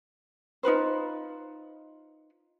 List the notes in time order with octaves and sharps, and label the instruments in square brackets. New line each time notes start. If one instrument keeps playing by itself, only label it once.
[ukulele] D#4 F4 B4 C5